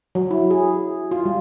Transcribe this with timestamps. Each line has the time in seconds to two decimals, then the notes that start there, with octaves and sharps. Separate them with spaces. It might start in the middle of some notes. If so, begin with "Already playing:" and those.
0.15 F#3
0.31 E4
0.50 G#4
1.11 F4
1.25 G3